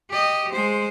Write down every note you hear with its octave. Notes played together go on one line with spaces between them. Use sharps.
G4 D#5
G#3 C5